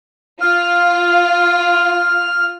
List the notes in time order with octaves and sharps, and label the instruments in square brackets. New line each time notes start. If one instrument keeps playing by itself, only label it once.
[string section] F4 [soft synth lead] F6